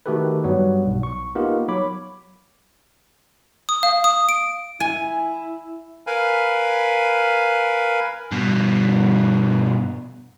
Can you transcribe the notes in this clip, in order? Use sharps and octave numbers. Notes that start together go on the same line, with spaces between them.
D#3 A3 F#4 G4 A4 B4
G2 F#3 G3 B3 F#4
B1
C#6
A#3 B3 D#4 F4 G4 A#4
F#3 C#5 B5 D6
D#6
F5
D#6
D7
E4 G#5
A#4 B4 F5 G#5 B5
G2 B2